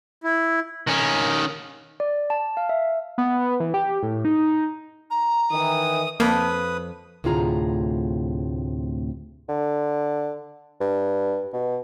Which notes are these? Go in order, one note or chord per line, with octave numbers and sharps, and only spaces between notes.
E4
D#3 C#4
D5
A5
F5
E5
B3
E3
G4
A2
D#4
A#5
D#3 E3 D#6
F2 A#3 B4 D#6
D2 A2 C3 F4 G#4 A#5
D3
G2
B2